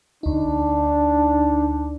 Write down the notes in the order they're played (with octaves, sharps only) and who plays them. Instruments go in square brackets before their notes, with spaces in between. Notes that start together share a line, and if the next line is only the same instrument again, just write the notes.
[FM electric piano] D2 D#4 [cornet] D4